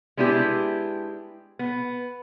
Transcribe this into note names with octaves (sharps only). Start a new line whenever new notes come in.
G#3 B3 D4 E4 G4
B3